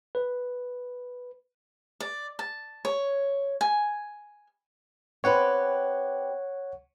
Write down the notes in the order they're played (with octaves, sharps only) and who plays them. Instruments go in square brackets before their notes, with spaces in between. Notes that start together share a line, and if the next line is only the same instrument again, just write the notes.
[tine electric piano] B4
[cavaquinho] D5
A5
C#5
G#5
[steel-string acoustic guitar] C4 G4 B4 [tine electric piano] C#5 F#5